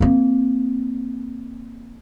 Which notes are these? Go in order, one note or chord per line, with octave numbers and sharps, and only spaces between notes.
A#3 C4